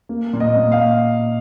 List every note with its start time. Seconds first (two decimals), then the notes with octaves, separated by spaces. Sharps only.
0.09 A#3
0.33 A#2
0.40 D#5
0.57 A#2
0.72 F5